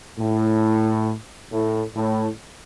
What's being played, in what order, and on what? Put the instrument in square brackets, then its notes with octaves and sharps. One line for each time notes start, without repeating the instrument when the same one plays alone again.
[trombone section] A2
A2
A2